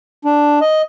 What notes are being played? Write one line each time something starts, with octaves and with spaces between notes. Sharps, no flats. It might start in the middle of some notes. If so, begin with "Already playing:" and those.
D4
D#5